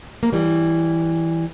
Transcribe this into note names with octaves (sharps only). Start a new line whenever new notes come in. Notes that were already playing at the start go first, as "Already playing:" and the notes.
A#3
E3 G3